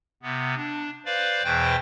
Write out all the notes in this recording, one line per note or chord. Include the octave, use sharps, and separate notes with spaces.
C3 B3
D4
B4 C5 D5 F5
E2 B2 E3 B4 C5 G5